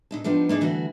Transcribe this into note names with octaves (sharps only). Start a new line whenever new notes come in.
A#2 D#4 A5
F3 B3 D4 D#4 G4 C5
A#3 D4 D#4 G#4
D2 E3 G3 F#4 A5